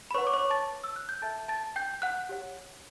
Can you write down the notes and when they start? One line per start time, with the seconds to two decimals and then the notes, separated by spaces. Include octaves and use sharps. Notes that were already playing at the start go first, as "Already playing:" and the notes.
0.11 B5
0.14 B4 C#5 F#5 C#6
0.27 D6
0.34 C#5 C#6
0.50 A5 A6
0.84 E6
0.96 F#6
1.09 G6
1.22 A4 E5 G5 A5 A6
1.48 A5 A6
1.76 G5 G6
2.02 F#5 F#6
2.29 G4 C#5 F#5